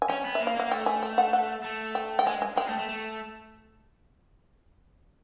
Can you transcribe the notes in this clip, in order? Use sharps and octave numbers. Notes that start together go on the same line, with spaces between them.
G#5
C#4 G5
B3
A#3 E5
F5
A#3 F#5
A3 G5
G#5
G5
F#5
F#5
A3
G5
G5
G#3 G#5
G#5
G#3 G5
A3
A3
A3